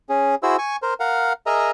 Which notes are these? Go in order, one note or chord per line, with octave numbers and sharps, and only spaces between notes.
C#4 G#4
E4 F#4 G#4 C5 E6
G#5 C#6
A#4 C5
A#4 F5 F#5
G#4 A#4 D#5 E5 A#5